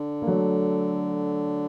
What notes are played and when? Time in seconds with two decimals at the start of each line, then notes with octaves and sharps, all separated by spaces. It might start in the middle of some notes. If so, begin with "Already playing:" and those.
Already playing: D3
0.22 A#3
0.27 F#3 A3